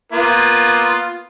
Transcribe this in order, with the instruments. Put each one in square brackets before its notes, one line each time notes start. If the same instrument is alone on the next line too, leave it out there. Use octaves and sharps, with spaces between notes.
[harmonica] A#3 B3 F4